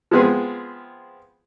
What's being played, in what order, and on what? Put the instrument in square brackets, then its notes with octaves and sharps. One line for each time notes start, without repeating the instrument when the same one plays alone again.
[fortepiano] F3 G#3 B3 C4 G#4